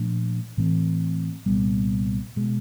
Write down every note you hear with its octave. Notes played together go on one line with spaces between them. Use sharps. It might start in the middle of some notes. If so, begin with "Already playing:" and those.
Already playing: A#2 F3 A3 D4
A2 E3 A3 C4
C2 A#2 G3 B3
B2 G#3